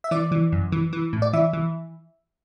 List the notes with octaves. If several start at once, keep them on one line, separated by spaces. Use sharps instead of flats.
E5
E3 D5
E3
F#2
E3
E3
A2
D5
E3 E5
E3